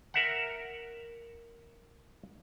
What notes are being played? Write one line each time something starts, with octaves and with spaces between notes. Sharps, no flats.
A#4 E5 F#5